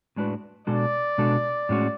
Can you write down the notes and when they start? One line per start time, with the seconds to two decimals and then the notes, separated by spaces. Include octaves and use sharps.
0.16 A2 G#3 D4 F#4 B4
0.67 B2 G#3 D4 F#4 A4 D5
1.18 B2 G#3 D4 F#4 A4
1.69 A2 G#3 C#4 F#4